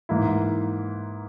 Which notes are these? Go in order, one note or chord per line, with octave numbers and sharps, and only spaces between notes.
G#2 E3 A#3 E4